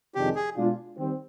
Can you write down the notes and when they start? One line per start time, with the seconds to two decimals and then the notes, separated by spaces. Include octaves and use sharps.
0.15 F2 C3 D#3 G#3 D4 G4
0.35 G#4
0.56 B2 G#3 D4 F4
0.98 D#3 G3 C4